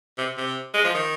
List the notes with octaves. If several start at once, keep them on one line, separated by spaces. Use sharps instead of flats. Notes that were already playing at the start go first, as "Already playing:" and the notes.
C3
C3
G#3
F3
D#3